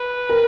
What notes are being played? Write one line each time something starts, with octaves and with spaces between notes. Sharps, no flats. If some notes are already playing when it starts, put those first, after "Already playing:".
Already playing: B4
A#4